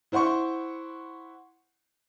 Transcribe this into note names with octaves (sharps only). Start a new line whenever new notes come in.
E4 C5 F#5 C6 C#6